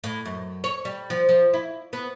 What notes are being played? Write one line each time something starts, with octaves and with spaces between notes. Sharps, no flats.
A2
F#2
C#5
G3
F3
F3
E4
B3